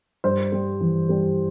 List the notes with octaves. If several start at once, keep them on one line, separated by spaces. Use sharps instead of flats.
G2 C5
G3
E3
G3